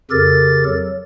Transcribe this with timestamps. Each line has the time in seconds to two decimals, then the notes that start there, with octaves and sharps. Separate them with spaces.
0.11 F2 C#3 G4 A4 A#4 A6
0.66 F#3